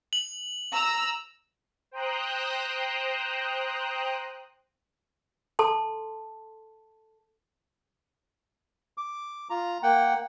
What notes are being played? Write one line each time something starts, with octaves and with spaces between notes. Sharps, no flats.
F#7
A#5 E6
C5 G5 A#5 D#6 F#6
A4 A5 C6
D6
F4 A#5
A#3 F#5 G5